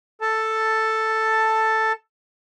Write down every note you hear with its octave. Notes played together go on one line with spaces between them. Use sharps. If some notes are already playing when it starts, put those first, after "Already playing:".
A4 A5